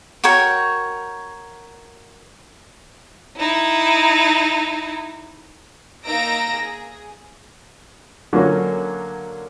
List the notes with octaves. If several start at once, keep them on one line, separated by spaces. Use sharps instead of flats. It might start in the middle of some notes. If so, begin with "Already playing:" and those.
F#4 A#4 C#5 G5
D#4 E4
A#3 D#4 A#5 E6 A#6 D7
G#4
D3 F#3 A#3 C#4